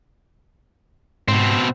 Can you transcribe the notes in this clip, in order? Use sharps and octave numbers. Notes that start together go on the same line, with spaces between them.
G#2 B2 C4